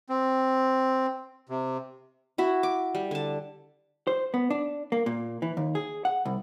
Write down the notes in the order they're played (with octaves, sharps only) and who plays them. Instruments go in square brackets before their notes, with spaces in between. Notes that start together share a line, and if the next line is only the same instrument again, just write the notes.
[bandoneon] C4
C3
[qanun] E4 F#4 E5
D6
G3
D3 A5
[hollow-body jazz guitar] C5
B3
D4
A#3
A#2
E3
D#2
G#4
F#5
C2